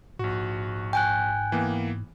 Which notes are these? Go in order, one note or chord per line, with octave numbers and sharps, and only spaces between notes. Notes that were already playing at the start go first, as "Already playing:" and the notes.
A#1 G#2 F#4
G5 G#5 F#6
E3 A#3 B3